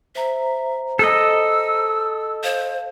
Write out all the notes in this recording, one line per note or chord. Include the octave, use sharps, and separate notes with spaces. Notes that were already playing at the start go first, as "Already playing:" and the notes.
C5 E5 A#5
A4 D#5 E6
C5 F5